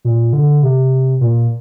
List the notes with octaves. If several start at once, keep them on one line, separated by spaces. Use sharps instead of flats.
A#2
D3
C3
A#2